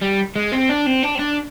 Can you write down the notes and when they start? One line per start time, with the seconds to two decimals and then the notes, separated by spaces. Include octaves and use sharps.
0.02 G3
0.36 G#3
0.52 C4
0.69 D4
0.86 C4
1.03 D4
1.15 C4
1.19 D4